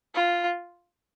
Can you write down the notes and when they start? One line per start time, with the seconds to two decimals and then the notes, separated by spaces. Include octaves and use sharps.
0.15 F4